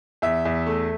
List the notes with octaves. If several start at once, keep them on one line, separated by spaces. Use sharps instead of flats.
E2 E5
E2
A3